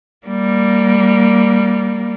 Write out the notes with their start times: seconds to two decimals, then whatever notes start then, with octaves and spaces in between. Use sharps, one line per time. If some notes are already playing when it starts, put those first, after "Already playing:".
0.27 G3 A#3